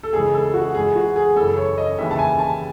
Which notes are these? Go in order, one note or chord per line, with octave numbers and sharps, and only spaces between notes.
A4
C#2 C#3 E3 G#4
A4
F#4
G#2 E3 G#4
F#4
G#4
F#2 C#3 E3 A4
C#5
D#5
D#2 C#3 E3 E5
A5
G#5
A5